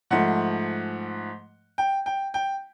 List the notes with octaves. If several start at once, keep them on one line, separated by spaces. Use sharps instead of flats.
G#2 F3 A3 F#5
G5
G5
G5